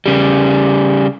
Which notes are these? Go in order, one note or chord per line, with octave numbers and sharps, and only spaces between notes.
C#3 G3